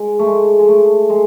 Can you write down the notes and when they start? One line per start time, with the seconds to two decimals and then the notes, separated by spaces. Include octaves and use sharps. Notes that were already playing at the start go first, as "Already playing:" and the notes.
Already playing: G#3
0.19 A3
0.27 G#3
0.59 G#3
0.68 A3
1.09 G#3